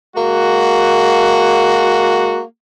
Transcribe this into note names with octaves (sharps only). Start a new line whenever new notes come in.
G#3 A#3 F#4